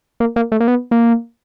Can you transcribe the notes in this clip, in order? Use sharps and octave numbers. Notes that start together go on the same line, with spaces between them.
A#3
A#3
A3
A#3
B3
A#3